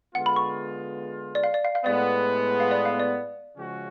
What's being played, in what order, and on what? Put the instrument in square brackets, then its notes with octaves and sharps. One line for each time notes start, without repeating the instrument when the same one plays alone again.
[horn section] D3 G#3 B3 F4 [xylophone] F#5
[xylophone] B5
C#6
D5
F5
D5
F5
F5
[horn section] A2 G#3 B3 [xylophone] D5
[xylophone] F5
D5
F5
D5
[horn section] C#3 F3 G#3 C#4 F#4